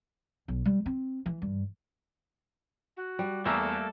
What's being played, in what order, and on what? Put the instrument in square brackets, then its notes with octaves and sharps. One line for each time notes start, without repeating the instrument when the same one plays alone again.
[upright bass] B1
G3
C4
E3
G2
[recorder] F#4
[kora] G3
[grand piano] E2 A#5 E6 [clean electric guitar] A3 A#3 [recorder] A4 [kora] E5